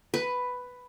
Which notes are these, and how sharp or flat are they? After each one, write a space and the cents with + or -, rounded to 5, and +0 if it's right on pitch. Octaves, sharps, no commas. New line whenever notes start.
B4 +5